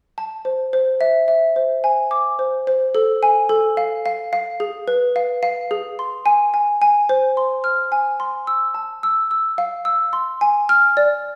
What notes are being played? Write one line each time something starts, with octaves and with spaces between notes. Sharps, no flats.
A5
C5
C5
E5
E5
C5
G#5
D6
C5
C5
A4
G#5
A4
F5
F5
F5
G#4
B4
F5
F5
G#4
C6
G#5
G#5
G#5
C5
C6
F6
G#5
C6
E6
A5
E6
E6
F5
E6
C6
G#5
F6
D5